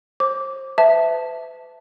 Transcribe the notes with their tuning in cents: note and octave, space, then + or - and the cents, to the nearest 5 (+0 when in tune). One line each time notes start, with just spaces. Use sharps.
C5 +35 D6 -15
B4 +40 E5 +0 A5 +0